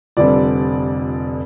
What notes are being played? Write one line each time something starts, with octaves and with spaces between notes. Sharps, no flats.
F1 F2 D3 G3 C4 D5